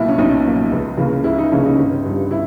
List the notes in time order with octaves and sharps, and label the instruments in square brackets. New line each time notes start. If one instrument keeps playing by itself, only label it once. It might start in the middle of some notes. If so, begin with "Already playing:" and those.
Already playing: [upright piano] B1 A#2 A#3 E4
C#4
B1 D#4
A#2 A#3
C#2
C#3 E3 A#3
C#2 E4
D#4
C#3 E3 A#3 C#4
D#4
G1
G2 G3
E4